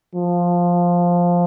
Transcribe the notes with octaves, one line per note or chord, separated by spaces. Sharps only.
F3